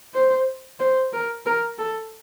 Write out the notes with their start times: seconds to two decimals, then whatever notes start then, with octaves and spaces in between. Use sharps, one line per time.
0.14 C5
0.79 C5
1.13 A#4
1.46 A#4
1.78 A4